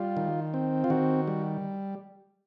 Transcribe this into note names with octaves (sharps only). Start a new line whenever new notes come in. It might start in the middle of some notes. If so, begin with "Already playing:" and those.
Already playing: G3 F4
D#3
C4
F4
D#3 F#4
G3